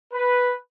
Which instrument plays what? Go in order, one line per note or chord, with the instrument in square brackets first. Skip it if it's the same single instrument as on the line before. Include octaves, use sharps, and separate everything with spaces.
[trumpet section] B4